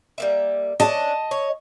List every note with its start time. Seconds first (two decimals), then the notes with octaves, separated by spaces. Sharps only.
0.18 G3 A#3 E5
0.80 C#4 D4 D#5 A5
1.31 C#5